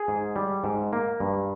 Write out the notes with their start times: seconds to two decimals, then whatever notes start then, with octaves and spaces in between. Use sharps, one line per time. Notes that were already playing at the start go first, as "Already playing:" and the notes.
Already playing: G#4
0.08 G#2
0.36 G3
0.64 G#2
0.93 A#3
1.20 G2